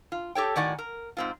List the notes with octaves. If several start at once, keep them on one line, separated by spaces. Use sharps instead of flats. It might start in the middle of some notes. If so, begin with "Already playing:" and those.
F4
G4 A4 C#5 G5
A2 D#3 F#4 D5 F#5 G#5
A#4
G#2 C4 F4